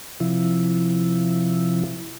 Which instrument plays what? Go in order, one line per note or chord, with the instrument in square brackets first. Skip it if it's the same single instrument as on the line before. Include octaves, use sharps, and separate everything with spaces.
[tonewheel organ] C3 F3 E4